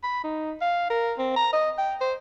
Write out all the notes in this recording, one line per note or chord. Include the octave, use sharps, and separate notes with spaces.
B5
D#4
F5
A#4
C4
A#5
D#5
G5
C5